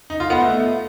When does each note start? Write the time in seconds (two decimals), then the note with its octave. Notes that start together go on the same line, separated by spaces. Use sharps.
0.10 D#4
0.20 F4
0.30 B3
0.40 A3